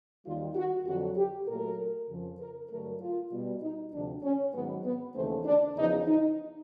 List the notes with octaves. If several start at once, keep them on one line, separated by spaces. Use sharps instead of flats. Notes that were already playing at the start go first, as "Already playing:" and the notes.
D#2 D#3 G3 F4
F#4
F2 D3 F#3 F#4
G4
A#2 F#3 A3 A#4
F2 C#3 F3
A#4
G2 D3 F#3 A3 A#4
F4
B2 G3
D#4
D2 C3 F3 D4
C#4
G#2 D#3 F#3 B3
B3
D#2 C#3 E3 A3 C4
D4
E2 C#3 F3 D#4
D#4